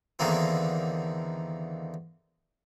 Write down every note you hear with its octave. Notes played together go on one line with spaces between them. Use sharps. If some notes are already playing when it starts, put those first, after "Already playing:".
E2 D3 D#3 A#3 C4